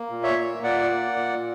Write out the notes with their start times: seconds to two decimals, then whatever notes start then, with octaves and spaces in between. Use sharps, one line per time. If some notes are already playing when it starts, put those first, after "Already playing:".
Already playing: A#3
0.10 A#2
0.23 C#5 E5
0.37 A#3
0.63 A#2 D5 F#5
0.89 A#3
1.16 A#2